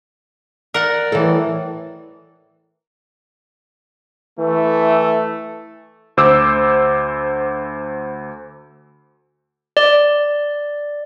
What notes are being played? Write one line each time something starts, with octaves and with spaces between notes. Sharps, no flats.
A#4 D5 F#5
A2 E3 A4
E3 A3
D2 C5 D6 E6
D5